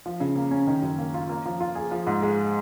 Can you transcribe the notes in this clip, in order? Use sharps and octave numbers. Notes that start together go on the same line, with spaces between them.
F3
C#3
A#3
C#4
D#3
F#2
A#3
F4
A#3
F3
F4
G#4
F3
G#2
G#3